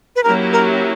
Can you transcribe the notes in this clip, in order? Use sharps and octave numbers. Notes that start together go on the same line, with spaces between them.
B4
F#3 A#3 C#4 E4 G4 A#4
A#4